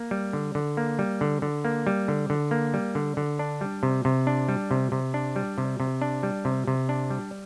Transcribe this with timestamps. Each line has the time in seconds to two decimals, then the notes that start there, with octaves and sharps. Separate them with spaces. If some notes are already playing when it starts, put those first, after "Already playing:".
Already playing: A#3
0.11 G3
0.33 D3
0.55 D3
0.77 A#3
0.99 G3
1.21 D3
1.42 D3
1.65 A#3
1.87 G3
2.08 D3
2.30 D3
2.51 A#3
2.74 G3
2.95 D3
3.17 D3
3.39 D4
3.61 G3
3.83 C3
4.05 C3
4.27 D4
4.49 G3
4.71 C3
4.92 C3
5.14 D4
5.36 G3
5.58 C3
5.80 C3
6.02 D4
6.23 G3
6.45 C3
6.67 C3
6.89 D4
7.10 G3